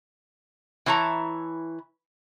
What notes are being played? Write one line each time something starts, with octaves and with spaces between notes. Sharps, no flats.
E3 E4 C#5 A5 A#5